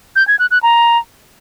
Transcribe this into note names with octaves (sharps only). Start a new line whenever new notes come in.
G6
G#6
F#6
F#6
A#5